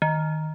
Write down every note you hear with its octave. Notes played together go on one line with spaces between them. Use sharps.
D#3